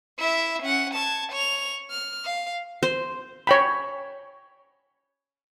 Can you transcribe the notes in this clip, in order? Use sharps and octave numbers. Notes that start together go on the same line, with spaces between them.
E4 E5
C#4 F#5
A5 G#6
C#5 F7
F6
F5
C5
C#5 G5 B5